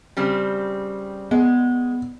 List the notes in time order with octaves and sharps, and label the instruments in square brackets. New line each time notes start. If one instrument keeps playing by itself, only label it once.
[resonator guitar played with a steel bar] C#3 G3 C4
[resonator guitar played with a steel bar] G#3 [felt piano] B3